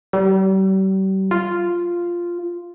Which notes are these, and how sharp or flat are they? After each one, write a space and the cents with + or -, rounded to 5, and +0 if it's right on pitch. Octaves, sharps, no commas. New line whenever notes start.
G3 -40
F4 -5